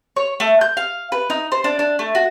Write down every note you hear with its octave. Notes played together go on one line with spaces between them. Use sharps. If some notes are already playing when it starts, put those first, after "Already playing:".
C#5
A3
G6
F5
B4
D#4
C5
D4
D4
A3
F#4